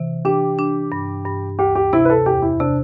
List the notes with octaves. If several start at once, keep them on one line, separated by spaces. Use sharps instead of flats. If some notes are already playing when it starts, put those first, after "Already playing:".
Already playing: C3 E3
D4 G4
D4
G2
G2
D2 G4
G4
C3 E4
B4
A4
E2 G4
E4
C3 D4